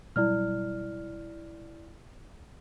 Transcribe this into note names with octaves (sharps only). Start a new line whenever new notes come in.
B2 F#3 G3 E4 D5 F6